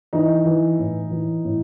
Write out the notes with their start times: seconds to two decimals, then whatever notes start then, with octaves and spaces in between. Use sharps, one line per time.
0.13 E3 D#4
0.46 E3
0.79 A2
1.11 E3
1.44 A2